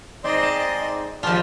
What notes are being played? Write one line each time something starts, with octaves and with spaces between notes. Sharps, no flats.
G#2 C4 D5 D#5 C6
A5
A#2 F3 G3 G#3 F4 D5 A5